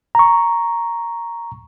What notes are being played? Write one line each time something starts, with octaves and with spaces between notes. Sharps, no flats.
A#5 C#6